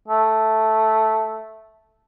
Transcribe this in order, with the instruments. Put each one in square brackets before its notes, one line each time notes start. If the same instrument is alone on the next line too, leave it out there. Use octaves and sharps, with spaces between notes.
[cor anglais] A3